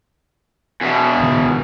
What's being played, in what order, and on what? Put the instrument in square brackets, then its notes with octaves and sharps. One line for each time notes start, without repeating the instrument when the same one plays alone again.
[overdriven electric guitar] E2 B2
[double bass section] C#2 A#2 D#3